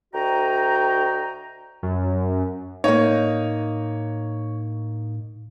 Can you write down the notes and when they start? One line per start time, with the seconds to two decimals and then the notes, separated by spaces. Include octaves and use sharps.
0.13 D2 F#4 D#5 G5 A#5
1.82 F#2
2.84 A2 A#3 D#4 C#5